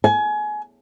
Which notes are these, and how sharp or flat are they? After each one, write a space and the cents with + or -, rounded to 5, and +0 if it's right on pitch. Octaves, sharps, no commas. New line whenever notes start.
G#5 +25